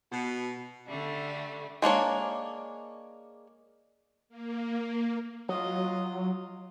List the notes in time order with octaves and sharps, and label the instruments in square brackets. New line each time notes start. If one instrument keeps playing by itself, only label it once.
[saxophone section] B2
[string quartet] D3 G3 A3
[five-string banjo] G#3 A#3 D4 C#5
[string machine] A#3
[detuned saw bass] F#3 [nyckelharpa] F4 D#5